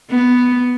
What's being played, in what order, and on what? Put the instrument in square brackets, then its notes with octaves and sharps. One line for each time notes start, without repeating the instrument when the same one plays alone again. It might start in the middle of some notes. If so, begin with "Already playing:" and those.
[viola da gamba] B3